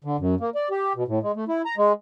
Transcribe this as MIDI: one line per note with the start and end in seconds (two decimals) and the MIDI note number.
0.04 0.17 50
0.19 0.35 42
0.40 0.50 58
0.55 0.69 74
0.70 0.93 67
0.95 1.04 47
1.08 1.19 45
1.23 1.32 56
1.36 1.44 57
1.48 1.62 64
1.66 1.75 82
1.77 1.92 56